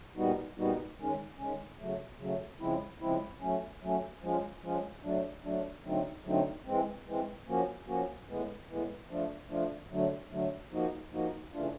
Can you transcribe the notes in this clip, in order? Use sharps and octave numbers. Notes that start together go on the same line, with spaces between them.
A#2 G3 B3 D#4 F#4
A#2 G3 B3 D#4 F#4
D#3 G#3 C#4
D#3 G#3 C#4
C#3 F#3 A3
C#3 F#3 A3
C#3 F3 G#3 C4 E4
C#3 F3 G#3 C4 E4
F#3 A3 C#4
F#3 A3 C#4
F3 G#3 C#4 F4
F3 G#3 C#4 F4
F#3 A3 D4
F#3 A3 D4
D3 F#3 A3 C4 D#4
D3 F#3 A3 C4 D#4
E3 G#3 C4
E3 G#3 C4
F3 A#3 C#4 F#4
F3 A#3 C#4 F#4
A2 E3 G#3 B3
A2 E3 G#3 B3
F3 A3 D4 F4
F3 A3 D4 F4
D3 F#3 A3
D3 F#3 A3
F3 A#3 D#4 F#4
F3 A#3 D#4 F#4
C#3 E3 A3 D4 F4